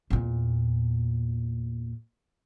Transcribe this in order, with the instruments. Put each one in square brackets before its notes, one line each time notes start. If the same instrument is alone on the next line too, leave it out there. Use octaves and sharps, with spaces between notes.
[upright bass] E2 A#2